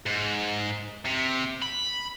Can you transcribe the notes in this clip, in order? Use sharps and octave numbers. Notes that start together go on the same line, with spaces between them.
G#2
C3
B5